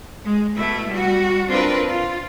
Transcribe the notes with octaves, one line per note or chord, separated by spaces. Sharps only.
G#3
B2 A3 E4
G3 F#4
C4 D4 F4 A#4 B4
F4